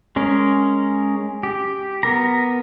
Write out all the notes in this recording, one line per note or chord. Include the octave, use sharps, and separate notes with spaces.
G#3 C#4 A#4
G4
B3 A#4 A#5